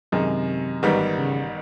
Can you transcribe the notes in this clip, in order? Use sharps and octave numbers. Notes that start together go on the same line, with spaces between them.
F#2 C3 D#3 G#3
A1 G#2 D#3 G3 B3
C#3